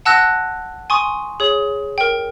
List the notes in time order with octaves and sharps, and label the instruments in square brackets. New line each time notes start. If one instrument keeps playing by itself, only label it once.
[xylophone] F#5 A5 E6 F#6 A#6
G#5 C6 C#6 D#6
G#4 C#5
A#4 G5